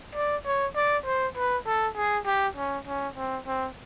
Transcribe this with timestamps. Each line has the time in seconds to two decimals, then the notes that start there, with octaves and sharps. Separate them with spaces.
0.15 D5
0.45 C#5
0.75 D5
1.05 C5
1.36 B4
1.66 A4
1.97 G#4
2.26 G4
2.56 C#4
2.87 C#4
3.17 C4
3.47 C4